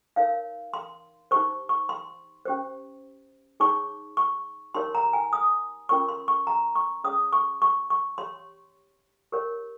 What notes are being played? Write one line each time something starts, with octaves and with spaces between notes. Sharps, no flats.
D#4 A#4 C#5 F5
C6
D#4 G4 C5 C#6
C#6
C6
C#4 G4 C5
D#4 G#4 C#5 C#6
C#6
D#4 G4 A#4 C#5 C6
A#5
G#5
D#6
C#4 F4 A#4 C#5 C#6
C6
C#6
A#5
C#6
C#4 G#4 C#5 D#6
C#6
C#6
C#6
G4 C#5 C6
G4 A#4 C#5